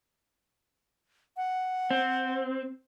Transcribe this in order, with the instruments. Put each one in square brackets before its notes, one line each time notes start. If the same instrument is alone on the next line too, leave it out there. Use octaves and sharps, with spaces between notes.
[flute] F#5
[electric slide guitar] C4